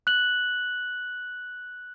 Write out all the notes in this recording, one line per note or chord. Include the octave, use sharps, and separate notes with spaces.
F#6 F#7